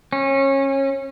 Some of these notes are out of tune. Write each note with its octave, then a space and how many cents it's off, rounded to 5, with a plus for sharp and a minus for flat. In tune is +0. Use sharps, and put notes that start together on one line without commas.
C#4 -25